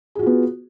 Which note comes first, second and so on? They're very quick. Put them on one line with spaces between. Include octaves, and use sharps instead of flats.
G#4 F#4 F4 B3